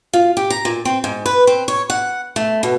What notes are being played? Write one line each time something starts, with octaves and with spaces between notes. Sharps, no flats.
F4
G4
A#5
A#2
C4
G#2
B4
C4
C#5
F#5
A3
B2